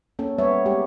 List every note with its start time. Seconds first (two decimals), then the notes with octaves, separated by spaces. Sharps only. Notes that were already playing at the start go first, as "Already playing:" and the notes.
0.19 A#3 C#4 A4
0.38 G3 B3 C#5 E5
0.66 G#3 G4